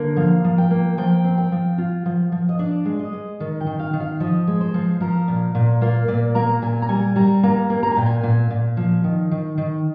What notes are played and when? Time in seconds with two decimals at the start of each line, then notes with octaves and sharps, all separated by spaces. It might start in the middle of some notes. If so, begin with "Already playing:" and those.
Already playing: D3 A#3
0.17 F3 F5
0.45 F3
0.58 G5
0.71 A#3
0.98 F3 G5
1.24 C4
1.38 G5
1.52 F3
1.78 F4
2.06 F3
2.32 F3
2.49 D#5
2.59 D4 D5
2.85 G#3
2.99 D#5
3.13 G#3
3.40 D#3
3.60 G5
3.67 D#3
3.79 F5
3.93 D#3
4.00 F5
4.20 F3 D#5
4.47 G#3
4.61 C5
4.74 F3
5.00 F3 A#4
5.28 A#2
5.55 A#2
5.81 A#3 F4
6.08 A#2 D5
6.35 A#3 A#5
6.62 A#2 G#5
6.82 A#5
6.89 G3 G#5
7.16 G3 A#5
7.43 A#3 A#5
7.70 A#3
7.83 A#5
7.91 G#5
7.96 A#2 G5
8.06 G#5
8.23 A#2
8.51 A#2
8.77 F3
9.04 D#3
9.31 D#3
9.58 D#3